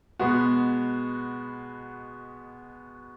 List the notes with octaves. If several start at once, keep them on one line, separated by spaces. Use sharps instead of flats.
B2 G#3 B3 F#4